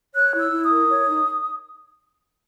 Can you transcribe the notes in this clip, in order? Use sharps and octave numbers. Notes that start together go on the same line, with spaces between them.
C#5 F#6
E4
E6
E4
D#6
A#4
C#5
D#4